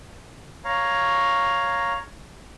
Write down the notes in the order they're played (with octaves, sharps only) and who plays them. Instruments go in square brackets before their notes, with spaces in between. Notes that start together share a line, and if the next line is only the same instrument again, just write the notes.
[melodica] C#5 F5 A#5